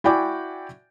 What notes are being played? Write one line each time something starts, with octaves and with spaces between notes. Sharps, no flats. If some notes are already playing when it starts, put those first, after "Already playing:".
E4 F#4 D5 G5 G#5 D6